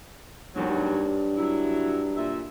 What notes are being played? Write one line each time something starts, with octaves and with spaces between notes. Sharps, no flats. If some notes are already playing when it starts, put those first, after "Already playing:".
E1 D#2 G#2 F#3
G2
F#3 E4
A#2 E5